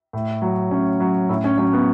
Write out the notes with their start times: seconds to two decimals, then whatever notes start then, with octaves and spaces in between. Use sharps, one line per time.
0.13 A2
0.42 F#3
0.71 A2 C#4
1.00 F#3
1.29 A2 C#4 E4
1.44 C#4
1.58 F#3 C#4
1.73 B3